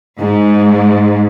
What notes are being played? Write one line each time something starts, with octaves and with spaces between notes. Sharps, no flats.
G#2